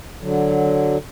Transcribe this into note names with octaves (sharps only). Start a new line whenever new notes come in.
D3 F#3